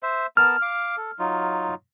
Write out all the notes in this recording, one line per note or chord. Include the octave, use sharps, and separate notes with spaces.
C5 E5
B3 A#4 A5 F6
F5 D6
A4
F#3 D#4 F4